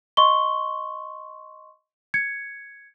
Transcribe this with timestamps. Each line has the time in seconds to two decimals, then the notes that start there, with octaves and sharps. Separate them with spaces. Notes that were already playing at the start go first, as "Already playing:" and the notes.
0.17 D#5 C6 C#6 G7
2.14 G#6 C#7